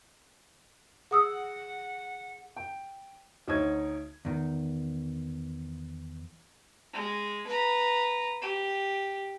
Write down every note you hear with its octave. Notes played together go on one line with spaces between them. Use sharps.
G#4 F#5 D#6 E6
G5
D2 D#4 C#5 G#6
E2 D#3
G#3
B4 A#5
G4